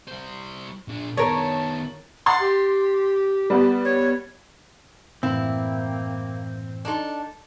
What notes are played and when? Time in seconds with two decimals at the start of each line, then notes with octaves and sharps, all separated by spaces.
0.08 G3 C5
0.88 A#2 D4
1.17 D#3 B3 A#4 C#5 A5
2.26 F#5 C6 A6
2.40 G4
3.50 G3 B3
3.85 C#5
5.23 F#2 A2 E3 A#3 C4 E4
6.85 D4 D#4 A4